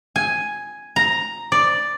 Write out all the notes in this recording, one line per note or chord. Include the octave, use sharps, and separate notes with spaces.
G#5
A#5
D5